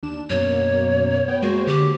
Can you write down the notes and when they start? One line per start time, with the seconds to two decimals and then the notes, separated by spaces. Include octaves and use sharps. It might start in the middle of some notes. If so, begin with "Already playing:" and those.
0.03 D#2 D4 E7
0.30 F#2 B2 A#3 C#5
1.28 B3 G5
1.42 G#3 A#3 F#4 C5
1.67 D3 G4